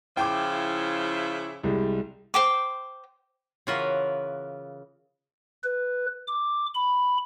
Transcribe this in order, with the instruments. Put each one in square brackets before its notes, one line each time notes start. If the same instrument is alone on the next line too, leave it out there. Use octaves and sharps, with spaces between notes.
[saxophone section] C#3 F3 E4 [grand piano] G5 D6
[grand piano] C2 G3 G#3
[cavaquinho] C5 G5 D6
[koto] C#3 E3 F4 F#4 A#4 B4
[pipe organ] B4
D6
B5